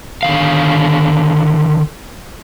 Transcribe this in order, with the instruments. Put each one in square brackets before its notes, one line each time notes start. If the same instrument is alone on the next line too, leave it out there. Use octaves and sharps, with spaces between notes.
[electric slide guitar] D3 D#3 F5